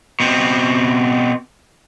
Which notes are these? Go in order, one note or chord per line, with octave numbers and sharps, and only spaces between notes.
B2 C4